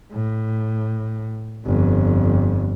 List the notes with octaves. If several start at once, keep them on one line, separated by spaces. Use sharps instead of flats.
A2
G1 F2